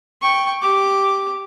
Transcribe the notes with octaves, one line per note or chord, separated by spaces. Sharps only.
G5 C#6
G4 D6